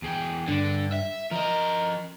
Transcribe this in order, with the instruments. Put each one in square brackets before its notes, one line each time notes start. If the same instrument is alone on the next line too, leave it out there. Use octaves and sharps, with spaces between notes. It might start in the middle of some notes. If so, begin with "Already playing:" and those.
[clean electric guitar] E2 G#4 G5
[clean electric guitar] G2 [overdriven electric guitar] D3
[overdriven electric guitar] E5
[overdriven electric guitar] F3 D#5 [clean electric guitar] A#4